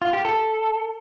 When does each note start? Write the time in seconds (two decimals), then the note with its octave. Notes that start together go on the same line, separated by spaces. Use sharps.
0.02 F4
0.13 G4
0.25 A4